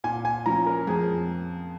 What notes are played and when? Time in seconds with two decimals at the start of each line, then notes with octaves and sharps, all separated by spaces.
0.04 A#2 G#5
0.25 G#5
0.46 F3 C#4 A#5
0.66 A#4
0.87 F2 G#4